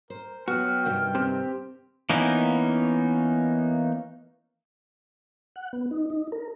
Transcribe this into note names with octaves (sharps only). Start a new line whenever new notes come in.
A#4 C5
F#3 B3 F#4 G5 F6
G2 C3 D#3
C4 G4
E3 A#3 B3 C#4 D#4
F#5
B3
D#4
D#4
A#4